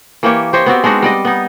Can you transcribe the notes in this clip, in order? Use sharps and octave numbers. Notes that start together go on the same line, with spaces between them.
E3 A#3 G4 C#5
G4 C5 C#5 D#5
B3 C4 F#4 G4
G#3 D4 D#4 F#4
G3 D5 D#5
B3 D#4